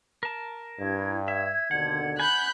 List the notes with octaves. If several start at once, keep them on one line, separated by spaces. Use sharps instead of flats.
A#4 A5
G2 E4 G#6
E5 G#6
D#2 B2 D3 F#5
F#5 G#5 B5 F#6 G6